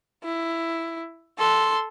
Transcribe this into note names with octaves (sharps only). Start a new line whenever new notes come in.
E4
A4 C6